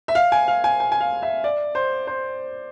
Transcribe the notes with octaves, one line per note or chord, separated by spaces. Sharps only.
E5
F5
G#5
F5
G#5
G#5
G#5
F5
E5
D5
C5
C5